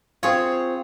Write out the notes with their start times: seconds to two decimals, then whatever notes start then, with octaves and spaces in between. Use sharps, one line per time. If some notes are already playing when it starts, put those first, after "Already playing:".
0.23 C4 F4 G#4 C#5